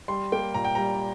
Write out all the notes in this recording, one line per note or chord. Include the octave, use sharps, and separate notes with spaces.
G3 C6
A#3 G5
A#2 A#5
G5
G3 A#5